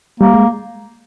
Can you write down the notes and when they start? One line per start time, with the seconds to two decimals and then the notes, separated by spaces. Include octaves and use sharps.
0.20 G3 A#3
0.34 G#3